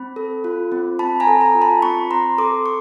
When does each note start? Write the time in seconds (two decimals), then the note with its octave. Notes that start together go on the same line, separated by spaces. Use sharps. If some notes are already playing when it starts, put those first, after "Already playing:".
Already playing: C4 B5
0.16 A4
0.44 F4
0.72 C4
0.99 C4 A5 B5
1.20 G#5 A#5
1.27 A4
1.41 G#5 A#5
1.55 F4
1.61 A5 B5
1.82 C4 B5 C#6
2.10 C4 A#5 C6
2.38 A4 C6 D6
2.66 C#6